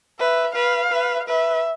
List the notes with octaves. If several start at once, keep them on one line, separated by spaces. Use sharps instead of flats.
B4 E5
B4 F5
B4
B4 E5